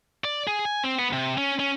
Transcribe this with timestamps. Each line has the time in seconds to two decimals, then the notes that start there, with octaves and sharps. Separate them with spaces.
0.24 D5
0.48 G#4
0.65 G#5
0.84 C4
0.99 B3
1.13 C3
1.38 C#4
1.60 C#4